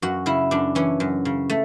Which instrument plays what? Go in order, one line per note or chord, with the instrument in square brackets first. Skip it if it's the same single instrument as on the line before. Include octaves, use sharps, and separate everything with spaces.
[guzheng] F#2 F#4
C#3 E4
F#2 D4
E3 C#4
F#2
C#3
A3